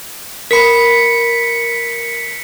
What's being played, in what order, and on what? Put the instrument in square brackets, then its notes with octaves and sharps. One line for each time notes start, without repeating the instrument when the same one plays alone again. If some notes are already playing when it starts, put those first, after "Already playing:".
[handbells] A#4 B5 [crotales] B6 C#7